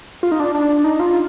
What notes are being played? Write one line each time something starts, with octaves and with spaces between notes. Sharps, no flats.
F4
D#4
D4
D4
D4
D#4
F4